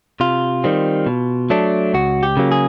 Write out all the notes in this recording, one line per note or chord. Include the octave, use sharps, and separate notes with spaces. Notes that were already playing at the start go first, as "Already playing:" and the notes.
C3 F4
D#3 G3 C4
B2
F#3 A3 D4
C#2 F#4
G4
C#3 F#3 A#3
G#4